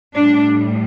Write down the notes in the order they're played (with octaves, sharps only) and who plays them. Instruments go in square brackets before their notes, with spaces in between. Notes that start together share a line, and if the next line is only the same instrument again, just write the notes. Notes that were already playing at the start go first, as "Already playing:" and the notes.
[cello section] A2 G3 D4